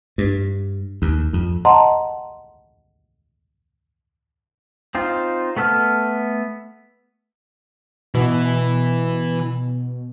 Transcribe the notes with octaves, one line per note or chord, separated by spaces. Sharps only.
G2
D#2
F2
D#5 F#5 A5 A#5 C6
C4 D#4 F4
A3 B3 A4 E6 F6
B2 E3